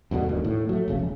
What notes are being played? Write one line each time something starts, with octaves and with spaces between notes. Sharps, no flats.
E2 G2 B2 D3
E1 D2 D#3
A2
F#3 A3
F1 A#1 C#3
E1